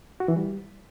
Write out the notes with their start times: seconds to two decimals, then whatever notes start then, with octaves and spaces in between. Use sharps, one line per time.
0.20 F#4
0.28 E3
0.36 G3